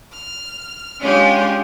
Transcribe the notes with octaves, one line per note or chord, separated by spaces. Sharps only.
F6
G#3 C#4 D4 F4 G4 G#4